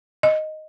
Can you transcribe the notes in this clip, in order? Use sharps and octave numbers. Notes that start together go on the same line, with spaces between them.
D#5